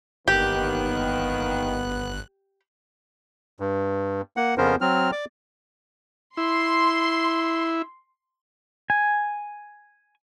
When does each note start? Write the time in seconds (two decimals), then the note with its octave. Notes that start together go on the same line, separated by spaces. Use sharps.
0.28 G1 D#2 D#3 B3 G4 F#6
3.60 G2
4.37 A#3 F#5
4.58 F2 C#3 B3 C#4 A#4 C5
4.81 F#3 C4 F6
5.12 D5 D6
6.37 E4 C6
8.90 G#5